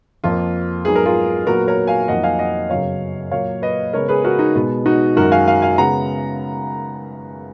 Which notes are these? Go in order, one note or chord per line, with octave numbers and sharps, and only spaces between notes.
F2 F3 A#3 F4
G#2 F#3 B3 G#4
A#4
F4 G#4
A#2 F#3 B3 F#4 A#4
A#4 C#5
F5 G#5
F2 D#3 F#3 A#3 D#5 F#5
F5 G#5
D#5 F#5
F#2 C#3 F#3 B3 C#5 F5
A#2 F#3 A#3 C#5 F5
B4 D#5
C#3 G#3 B3 A#4 C#5
G#4 B4
F#4 A#4
D#4
B2 G#3 B3
D#4 F#4
F#2 D#3 G#3 F#4 A#4
F5 G#5
F5 G#5
F5 G#5
C#3 G#3 B3 F#5 A#5